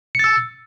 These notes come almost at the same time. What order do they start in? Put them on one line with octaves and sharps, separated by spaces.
C#7 A6 E6